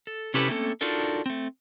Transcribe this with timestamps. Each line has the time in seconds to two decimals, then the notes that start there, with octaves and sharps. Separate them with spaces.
0.07 A4
0.34 C3 C#4 E4 G4 A4 B4
0.48 A3 A#3 C4 C#4 F#4 A4
0.81 D4 D#4 F4 F#4 A4 A#4
1.26 A3 C4